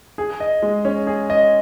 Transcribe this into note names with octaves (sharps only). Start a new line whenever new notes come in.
G#4
D#5
G#3
C#4
G#4
D#5